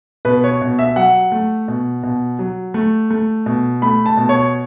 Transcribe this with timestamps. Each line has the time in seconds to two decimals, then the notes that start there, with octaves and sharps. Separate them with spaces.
0.25 B2 B4
0.44 C#5
0.62 B2
0.79 E5
0.96 F#3 F#5
1.32 A3
1.68 B2
2.03 B2
2.39 F#3
2.74 A3
3.10 A3
3.46 B2
3.82 A3 B5
4.06 A5
4.17 B2
4.29 C#5